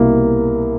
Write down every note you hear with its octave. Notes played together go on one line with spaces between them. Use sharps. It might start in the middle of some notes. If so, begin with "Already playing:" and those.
Already playing: C2 B2 A#3